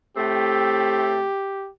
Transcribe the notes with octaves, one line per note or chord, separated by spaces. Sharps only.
A2 A3 C4 G4